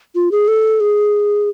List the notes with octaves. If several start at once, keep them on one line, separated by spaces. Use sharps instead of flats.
F4
G#4
A4
G#4